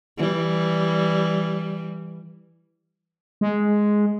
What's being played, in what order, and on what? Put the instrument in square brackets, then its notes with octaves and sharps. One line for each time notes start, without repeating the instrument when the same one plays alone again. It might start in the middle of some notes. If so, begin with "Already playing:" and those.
[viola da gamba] E3 G3
[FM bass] G#3